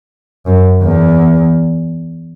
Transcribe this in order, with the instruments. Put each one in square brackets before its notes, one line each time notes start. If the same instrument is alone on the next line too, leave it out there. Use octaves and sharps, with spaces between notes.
[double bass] F#2
E2